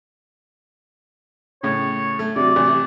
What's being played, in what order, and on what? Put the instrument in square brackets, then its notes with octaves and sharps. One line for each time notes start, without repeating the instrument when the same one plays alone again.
[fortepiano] A2 C#3 [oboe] C#5
[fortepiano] A3
[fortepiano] C3 F#3 [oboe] D5
[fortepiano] A1 C3